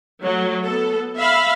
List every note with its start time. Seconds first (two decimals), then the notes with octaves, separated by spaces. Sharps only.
0.23 F#3 A3
0.64 B3 A4
1.17 E5 F5 B5